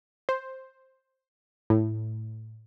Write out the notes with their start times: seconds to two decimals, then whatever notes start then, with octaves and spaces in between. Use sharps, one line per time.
0.29 C5
1.70 A2